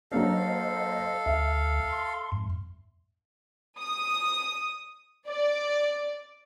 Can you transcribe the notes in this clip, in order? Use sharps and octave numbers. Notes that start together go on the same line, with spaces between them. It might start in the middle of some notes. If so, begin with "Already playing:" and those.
F#3 A#3 D4 A4 C5 D#5 F5
D2 E5
C6
F2 G#2
D#6
D5